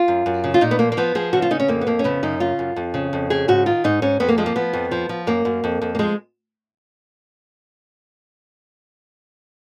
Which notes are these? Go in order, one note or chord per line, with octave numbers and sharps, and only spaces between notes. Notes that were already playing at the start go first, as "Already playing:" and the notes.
Already playing: F4
F#2
F#2
C#3
F4
A#2 D#4
B3
F3 A#3
A#3
F3 B3
F3 G#4
C#3 F#4
F4
C#3 D#4
C#4
F2 A#3
B3
F2 A#3
C#4
C#3 B3
F#2 D#4
C#3 F4
F#2
F2
C#3
F2
C#3 G#4
G#2 F#4
D#3 F4
G#2 D#4
G#2 C#4
F2 B3
A#3
F3 G#3
A#3
F3 B3
F2
F3
F3
F#2 A#3
F#2
F2
F2
A#3
F3 G#3